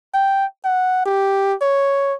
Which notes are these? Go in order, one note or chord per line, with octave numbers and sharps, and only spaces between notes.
G5
F#5
G4
C#5